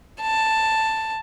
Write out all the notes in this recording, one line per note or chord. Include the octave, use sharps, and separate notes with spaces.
A5